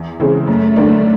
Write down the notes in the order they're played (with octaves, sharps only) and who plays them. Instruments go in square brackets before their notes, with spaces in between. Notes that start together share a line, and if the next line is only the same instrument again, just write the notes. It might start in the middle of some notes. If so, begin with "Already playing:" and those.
Already playing: [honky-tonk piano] E2
C#3 E3 G#3 C4
[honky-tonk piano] F#2 [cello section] A3
[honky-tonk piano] D3 G3 A#3 D4